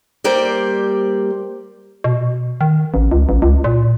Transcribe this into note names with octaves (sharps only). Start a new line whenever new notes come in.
G3 A#3 G4 C5 D5
B2
D#3
A1
C#2
A1
C#2
A#2